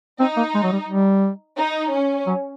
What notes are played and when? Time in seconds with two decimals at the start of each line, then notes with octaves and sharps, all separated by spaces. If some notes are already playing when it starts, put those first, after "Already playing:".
0.20 C4 D#4
0.37 A#3
0.55 G#3
0.63 F#3
0.72 G3
0.88 G3
1.58 D#4
1.92 C#4
2.27 F#3